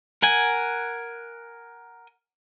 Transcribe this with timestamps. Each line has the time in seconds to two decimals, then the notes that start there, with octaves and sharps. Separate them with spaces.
0.22 A#4 F#5 G#5